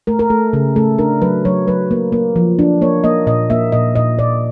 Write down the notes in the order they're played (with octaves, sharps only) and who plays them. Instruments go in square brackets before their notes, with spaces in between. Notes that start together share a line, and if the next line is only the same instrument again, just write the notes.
[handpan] A3 A#4
A#4
A3 A4
C#3 G#4
A3 A4
D4 A#4
F#3 B4
F#3 C#5
F#3 B4
A#3
A#3
F3
D4
A#3 C#5
A#3 D#5
A#2 D#5
A#3 E5
A#2 D#5
A#2 D#5
A#2 D5